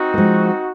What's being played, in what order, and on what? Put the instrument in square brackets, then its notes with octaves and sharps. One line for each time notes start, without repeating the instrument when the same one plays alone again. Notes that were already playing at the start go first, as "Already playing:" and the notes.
Already playing: [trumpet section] C4 D#4 F#4
[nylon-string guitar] A#3
F3 G#3